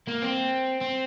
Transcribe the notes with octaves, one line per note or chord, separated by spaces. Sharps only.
A#3
C4
C4